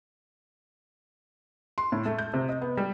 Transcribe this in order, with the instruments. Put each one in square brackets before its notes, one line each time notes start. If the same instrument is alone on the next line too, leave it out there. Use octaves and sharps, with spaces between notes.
[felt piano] C6
A2
A3
G6
C3
D#5
B3
G3